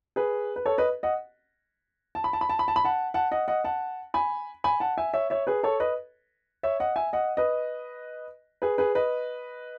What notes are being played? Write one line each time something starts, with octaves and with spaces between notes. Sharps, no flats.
G#4 B4
B4
A4 C#5
B4 D#5
D#5 F#5
A5
B5
A5
B5
A5
B5
A5
B5
F#5 A5
F#5 A5
D#5 F#5
D#5 F#5
F#5 A5
G#5 B5
G#5 B5
F#5 A5
E5 G#5
C#5 E5
C#5 E5
G#4 B4
A4 C#5
B4 D#5
C#5 E5
D#5 F#5
E5 G#5
D#5 F#5
B4 D#5
G#4 B4
G#4 B4
B4 D#5